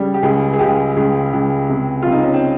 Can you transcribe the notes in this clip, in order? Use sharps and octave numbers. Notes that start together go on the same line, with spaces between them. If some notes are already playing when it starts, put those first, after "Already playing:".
Already playing: C#3 G3
G4
C#2 G#4
G#4
C#2 G4
C#2 G#4
C#2
C3
C3 F4
D#4
C#4
C4